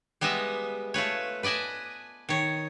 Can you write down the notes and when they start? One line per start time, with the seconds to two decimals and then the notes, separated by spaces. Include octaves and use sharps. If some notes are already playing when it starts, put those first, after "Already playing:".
0.21 G3 G#3 B3 D#5 E5
0.94 A3 F4 B4 C#5
1.43 B4 D5 D#5 G#5 A5
2.29 D#3 C#5